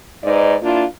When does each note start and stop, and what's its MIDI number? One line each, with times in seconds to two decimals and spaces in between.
0.24 0.55 44
0.24 0.55 63
0.24 0.55 71
0.24 0.55 74
0.24 0.55 75
0.63 0.84 58
0.63 0.84 62
0.63 0.84 64
0.63 0.84 65